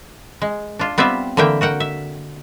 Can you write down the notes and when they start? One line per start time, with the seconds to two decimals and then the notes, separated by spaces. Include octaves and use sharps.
0.42 G#3
0.79 D4 F4
0.98 G3 B3 C4 F4 D5 E5
1.37 D3 E3 A#3 E5 G5
1.61 F#4 A#4 F#5 G5
1.80 E5